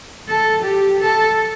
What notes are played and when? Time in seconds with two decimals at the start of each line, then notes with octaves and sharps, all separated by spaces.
0.28 A4
0.63 G4
1.00 A4